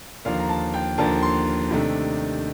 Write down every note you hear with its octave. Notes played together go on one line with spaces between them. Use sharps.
D#2 D3 F3 A#3 F5
A#5
A5
G5
D#2 D3 F3 A#3 A5
C6
C3 D#3 A3 D4